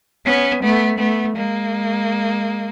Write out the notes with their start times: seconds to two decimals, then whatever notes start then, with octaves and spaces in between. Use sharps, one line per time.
0.26 B3 C#4
0.63 A3 B3
0.99 A3 B3
1.36 G#3 A#3